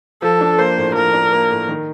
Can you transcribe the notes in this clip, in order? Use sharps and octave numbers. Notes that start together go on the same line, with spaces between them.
F3 A4
D4
A#3 C5
A2
F3 A#4
D4
A#3
A2
D#3